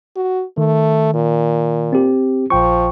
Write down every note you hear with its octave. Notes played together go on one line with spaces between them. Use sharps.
F#4
D#3 A3
A#2
C4 G4
A#1 F3 G5 C#6